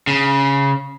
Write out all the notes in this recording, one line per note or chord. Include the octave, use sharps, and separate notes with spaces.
C#3